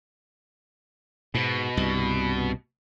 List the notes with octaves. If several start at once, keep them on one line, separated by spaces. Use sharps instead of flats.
G#2 B2
C2 G2